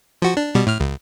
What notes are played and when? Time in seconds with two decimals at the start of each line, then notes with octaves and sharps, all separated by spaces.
0.22 F3 F#4
0.37 D4
0.55 B2 G3
0.67 A2 F6
0.80 C#2